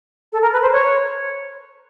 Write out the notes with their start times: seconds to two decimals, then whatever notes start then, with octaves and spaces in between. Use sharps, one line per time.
0.32 A4
0.41 A#4
0.52 B4
0.62 C5
0.72 C#5